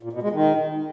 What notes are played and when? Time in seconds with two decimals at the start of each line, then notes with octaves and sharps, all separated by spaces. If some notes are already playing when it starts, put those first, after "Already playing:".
0.03 A#2
0.13 B2
0.22 G#3
0.32 D#3